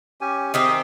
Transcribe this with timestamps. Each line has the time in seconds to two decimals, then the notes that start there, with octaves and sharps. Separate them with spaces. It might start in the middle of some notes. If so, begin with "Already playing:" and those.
0.21 C#4 G4 G#5
0.54 D#3 C4 D#4 G4 G#4 E5